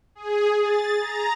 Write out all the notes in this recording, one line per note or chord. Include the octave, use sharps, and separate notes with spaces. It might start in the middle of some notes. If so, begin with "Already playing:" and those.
G#4
A6
A#5